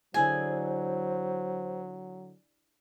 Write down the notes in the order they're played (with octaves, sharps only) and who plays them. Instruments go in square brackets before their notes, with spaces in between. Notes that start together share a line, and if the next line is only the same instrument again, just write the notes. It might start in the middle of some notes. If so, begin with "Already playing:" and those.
[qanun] D3 E4 G#4 [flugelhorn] F#3 [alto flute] C5 [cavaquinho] G#5